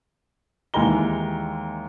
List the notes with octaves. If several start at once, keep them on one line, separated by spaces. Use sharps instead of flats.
D#2 E3 G#3 A#5 G7